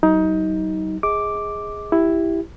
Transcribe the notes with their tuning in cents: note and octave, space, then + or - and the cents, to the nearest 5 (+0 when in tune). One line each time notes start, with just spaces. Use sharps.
F#3 +45 D#4 +20
G#4 -5 D#5 +30 D6 +0
E4 +0 G4 +0